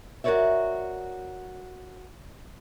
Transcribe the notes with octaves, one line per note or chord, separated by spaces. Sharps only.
F#4 A#4 B4 C#5 D5 E5